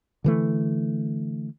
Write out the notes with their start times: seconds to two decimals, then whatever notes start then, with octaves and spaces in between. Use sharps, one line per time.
0.24 D3 E3 A3